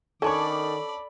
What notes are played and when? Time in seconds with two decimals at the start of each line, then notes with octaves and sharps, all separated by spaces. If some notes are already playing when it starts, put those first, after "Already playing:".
0.22 D#3 C#4 D4 A4 C#5 D5 B5 D6